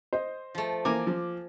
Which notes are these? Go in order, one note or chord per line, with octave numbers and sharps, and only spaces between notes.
C5 D#5
F3 A3
E3 A#3 G#5 A#5 D6
F3